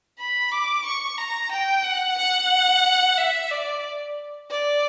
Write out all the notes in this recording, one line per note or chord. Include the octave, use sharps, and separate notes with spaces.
B5
D6
C#6
A#5
G5
F#5
F#5
E5
D5
D5